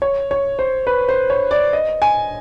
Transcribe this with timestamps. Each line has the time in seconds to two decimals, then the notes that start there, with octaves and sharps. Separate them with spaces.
0.02 C#5
0.31 C#5
0.59 C5
0.87 B4
1.09 C5
1.30 C#5
1.51 D5
1.73 D#5
2.02 G#5